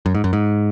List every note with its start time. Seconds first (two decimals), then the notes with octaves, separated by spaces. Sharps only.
0.06 F#2
0.14 G#2
0.24 F#2
0.33 G#2